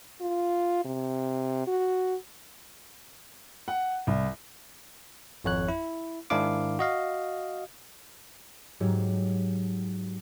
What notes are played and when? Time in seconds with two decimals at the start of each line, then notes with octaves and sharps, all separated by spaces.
0.21 F4
0.85 C3
1.67 F#4
3.68 F#5
4.07 C2
5.44 G#1 F2 C#5 F#6
5.68 E4
6.30 G#2 D#3 D4 E4 F5 D6
6.79 F#4 D#5 F5
8.80 G#2 F#3 G4